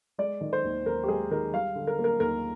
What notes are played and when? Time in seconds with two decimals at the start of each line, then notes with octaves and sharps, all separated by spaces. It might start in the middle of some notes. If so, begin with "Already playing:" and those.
0.18 G#3 D5
0.41 D#3
0.53 C5
0.64 D#2
0.86 D#2 A#4
1.04 G4
1.08 G#3 G#4
1.31 D#3 A#4
1.53 G3 F5
1.75 D3
1.87 A#4
1.99 A#3
2.04 A#4
2.20 D#2 A#4